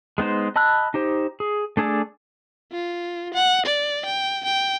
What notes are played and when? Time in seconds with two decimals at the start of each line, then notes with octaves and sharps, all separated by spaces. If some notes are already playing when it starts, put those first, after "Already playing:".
0.18 G#3 B3 D#4 C5
0.56 D#5 A5 B5 E6 F#6
0.94 D#4 G4 C5
1.40 G#4
1.77 A3 D4 G#4 A4 D5
2.72 F4
3.34 F#5
3.66 D5
4.05 G5
4.45 G5